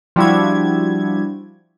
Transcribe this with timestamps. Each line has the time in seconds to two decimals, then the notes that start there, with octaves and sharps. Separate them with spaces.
0.16 F3 G3 D4 E4 F#4 G#6